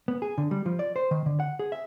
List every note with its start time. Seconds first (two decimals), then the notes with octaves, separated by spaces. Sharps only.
0.08 B3
0.22 G#4
0.38 D3
0.51 G3
0.66 F3
0.79 D5
0.96 C5
1.11 D#3
1.26 D3
1.40 F#5
1.59 G#4
1.72 E5